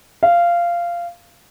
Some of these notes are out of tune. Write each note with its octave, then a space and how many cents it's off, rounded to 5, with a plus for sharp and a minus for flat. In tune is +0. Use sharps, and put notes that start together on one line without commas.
F5 -15